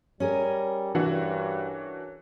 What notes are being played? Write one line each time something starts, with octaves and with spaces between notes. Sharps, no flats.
G3 C#4 G#4 A#4
G2 E3 D4 F#4